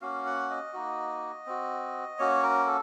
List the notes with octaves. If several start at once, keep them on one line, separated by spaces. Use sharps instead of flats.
A#3 C#4 F#4 F5
F#5
D#5
A#3 D#4 F#4
C4 F#4
A#3 C#4 F#4 C#5
A#4
A4